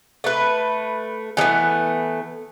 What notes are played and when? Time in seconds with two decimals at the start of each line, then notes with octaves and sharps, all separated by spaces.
0.24 A3 B4
1.37 E3 G#3 A3 B3